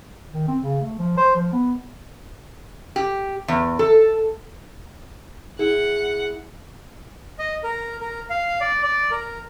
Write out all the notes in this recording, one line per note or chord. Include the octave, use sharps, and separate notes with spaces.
D#3
C4
C#3
A3
F3
C5
F3
B3
G4
E2
A4
E4 G#4 F#5
D#5
A#4
A#4
F5
D5
D5
A#4